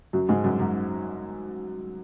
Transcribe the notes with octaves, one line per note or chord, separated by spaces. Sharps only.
F#2 F#3
G#2 G#3
F#2 F#3
F#2 F#3